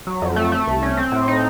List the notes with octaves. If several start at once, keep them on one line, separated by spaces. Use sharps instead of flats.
F#3
F2
A3
A3
C2
C#4
C4
A2
D#4